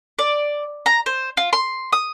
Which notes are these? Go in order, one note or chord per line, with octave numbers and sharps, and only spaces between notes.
D5
A#5
C5
F4
C6
D#6